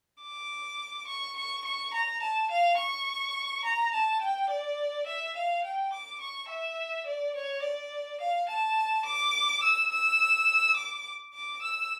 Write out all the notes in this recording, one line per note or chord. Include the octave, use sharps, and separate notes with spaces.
D6
C#6
C#6
C#6
A#5
A5
F5
C#6
A#5
A5
G5
D5
E5
F5
G5
D6
C#6
E5
D5
C#5
D5
F5
A5
D6
E6
E6
D6
D6
E6